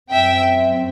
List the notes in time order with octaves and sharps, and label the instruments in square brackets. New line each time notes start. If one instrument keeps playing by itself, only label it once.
[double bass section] F#2 F#3 C4 [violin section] E5 G5